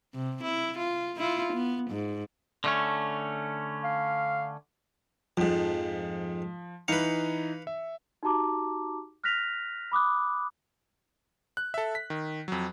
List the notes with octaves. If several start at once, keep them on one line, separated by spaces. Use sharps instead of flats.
C3
E4
F4
E4 F4
B3
G#2
D3 A3 C#4
F5
F2 G#2 F3
E3 D#4 B4 F5 C#7
E5
D#4 F#4 G4 A5 A#5 D6
F6 F#6 A#6 B6 F7
B5 D6 D#6 F#6
F#6
A4 E5
B6
D#3
F2 F#3